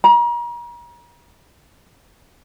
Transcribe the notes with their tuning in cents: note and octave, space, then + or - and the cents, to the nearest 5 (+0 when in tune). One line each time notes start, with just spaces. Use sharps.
A#5 +40